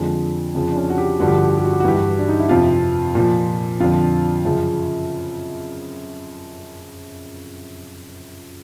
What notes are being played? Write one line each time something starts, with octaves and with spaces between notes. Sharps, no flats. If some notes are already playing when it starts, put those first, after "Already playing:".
Already playing: F2 D3 F3 G#3
F2 C#3 F3
D4
C#4
F#4
G4
G2 D3 F3 F#4
G4
F#4
G4
F#4
G4
F#4
G4
F#4
G2 E3 G4
F#4
D4
D#4
E4
F2 C3 F3 F4
A#2 F3
F2 D3 F3 F4
F#2 C#3 F3